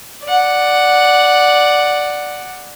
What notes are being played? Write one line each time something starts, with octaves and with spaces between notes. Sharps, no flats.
D5 F#5